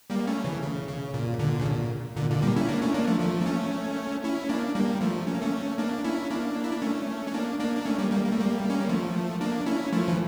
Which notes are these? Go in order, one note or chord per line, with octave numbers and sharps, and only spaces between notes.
G3 A#3
A3 C#4
C#3 E3
C#3
C#3
A#2
A#2 D3
C#3
A#2
A#2 D3
A#2 D3
G3 A#3
C#4 E4
A#3 D4
A3 C#4
A#3 D4
F3 A3
F3 A3
A#3
A3 C#4
C#4 E4
A#3 D4
G3 A#3
F3 A3
C#4
A#3
A3 C#4
A#3 D4
C#4 E4
A#3 D4
E4
D4
A3 C#4
C#4
A#3 D4
A#3 D4
D4
A3 C#4
G3 A#3
G3 A#3
A#3
A3
G3 A#3
C#4
A#3
F3 A3
A#3 D4
C#4 E4
F3 A3
E3